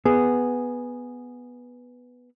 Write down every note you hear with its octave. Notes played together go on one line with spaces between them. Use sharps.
B3 G#4